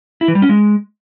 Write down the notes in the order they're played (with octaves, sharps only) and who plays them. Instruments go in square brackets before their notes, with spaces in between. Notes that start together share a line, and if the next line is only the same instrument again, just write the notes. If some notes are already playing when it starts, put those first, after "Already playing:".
[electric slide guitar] E4
E3
G3
C#4
G#3